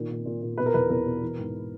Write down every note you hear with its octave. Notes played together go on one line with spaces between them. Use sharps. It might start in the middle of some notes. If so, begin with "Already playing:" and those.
Already playing: A#2 D#3
A#2
A#2
A#2
B2 B4
A#4
E2 B4
E2 A#4
B2
E3
G#2